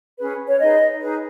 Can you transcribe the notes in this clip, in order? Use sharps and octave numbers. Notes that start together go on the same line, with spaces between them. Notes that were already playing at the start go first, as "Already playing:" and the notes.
C#4 G#4 B4
C#5
D#4 G#4 B4 D#5
D#4 G#4 B4